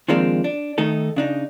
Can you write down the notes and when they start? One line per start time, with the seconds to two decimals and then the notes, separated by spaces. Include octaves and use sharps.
0.08 D#3 F3 G#3 A#3 C4 D4
0.44 D4
0.78 D#3 A3 D#4 A4
1.16 C#3 D4 D#4